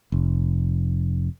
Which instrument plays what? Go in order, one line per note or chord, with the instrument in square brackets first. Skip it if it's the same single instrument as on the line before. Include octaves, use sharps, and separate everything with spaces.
[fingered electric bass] F1